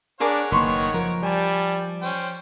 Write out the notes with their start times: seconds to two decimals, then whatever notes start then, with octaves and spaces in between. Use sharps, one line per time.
0.20 D4 G#4 A#4 C#5 F#5 D6
0.52 F#1 D#3 A#3 B4 C6 C#6
0.94 F3 A#4
1.23 G3 G#5 A5
2.02 C#4 C5 G5